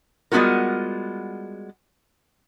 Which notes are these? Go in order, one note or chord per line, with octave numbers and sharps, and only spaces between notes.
G3 G#3 B3 F4 F#4 A#4